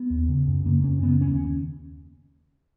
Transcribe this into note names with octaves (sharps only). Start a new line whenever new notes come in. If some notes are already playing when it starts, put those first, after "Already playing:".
Already playing: B3
D#2
C#3
F#2
C#3 A#3
F#2 C#4
C#3 B3
D#2 C#4